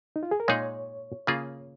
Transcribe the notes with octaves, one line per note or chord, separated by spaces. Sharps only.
D#4
F4
G#4
A#4
A#2 G#3 D#4 G#4 C#5
C#3 A#3 F4 G#4